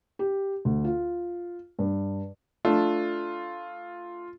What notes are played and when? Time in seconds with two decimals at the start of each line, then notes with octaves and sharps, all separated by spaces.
0.19 G4
0.65 D2
0.84 F4
1.79 G2
2.65 A3 D4 F4